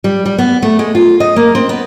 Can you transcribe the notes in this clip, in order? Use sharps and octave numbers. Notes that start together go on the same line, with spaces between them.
G3
G3
B3
A3
G#3
F4
D#5
A#3
C4
B3